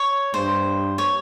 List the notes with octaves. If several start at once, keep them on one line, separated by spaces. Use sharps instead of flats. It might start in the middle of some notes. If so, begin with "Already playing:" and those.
Already playing: C#5
G2 C5
C#5